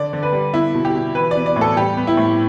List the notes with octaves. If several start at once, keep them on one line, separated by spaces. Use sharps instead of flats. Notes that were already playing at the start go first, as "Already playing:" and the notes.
Already playing: D3 D5
D3
B4
G3
B3 E4
B2
G4
B2
E3 B4
B3 D5
D5
A2
A4
G3 G4
B3
E4
A2